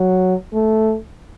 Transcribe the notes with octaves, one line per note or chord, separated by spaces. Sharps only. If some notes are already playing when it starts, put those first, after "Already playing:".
Already playing: F#3
A3